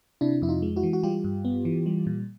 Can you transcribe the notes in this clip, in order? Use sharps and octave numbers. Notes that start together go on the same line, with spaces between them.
C3 D4 E4
F2 E4
D#4 F4
G#3
E4 F#4
E3
F#4
G3 F4 G4
G2
B3
E3
G3
A#2